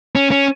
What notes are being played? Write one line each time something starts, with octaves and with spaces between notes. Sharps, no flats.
C#4
C#4